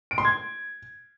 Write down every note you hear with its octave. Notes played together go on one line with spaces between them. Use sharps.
D7
C6
G#6